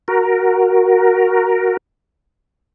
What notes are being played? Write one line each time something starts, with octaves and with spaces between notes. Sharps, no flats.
F#4 A#4